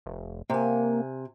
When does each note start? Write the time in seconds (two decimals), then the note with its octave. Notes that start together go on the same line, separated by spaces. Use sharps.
0.06 F1
0.50 C3 A#3 G#5